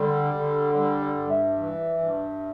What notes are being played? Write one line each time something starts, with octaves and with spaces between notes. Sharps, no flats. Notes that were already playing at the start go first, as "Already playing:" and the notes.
Already playing: D3 G3 C6
D3
G3 D5
D5
G2
E5
E3
G2